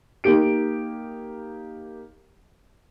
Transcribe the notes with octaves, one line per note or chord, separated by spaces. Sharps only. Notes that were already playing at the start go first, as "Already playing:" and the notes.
A#3 D#4 G4 D7